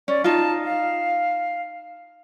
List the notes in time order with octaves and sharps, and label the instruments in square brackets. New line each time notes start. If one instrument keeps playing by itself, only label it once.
[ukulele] C#4 [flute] D5
[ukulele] D#4 F4 [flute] A5
[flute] F5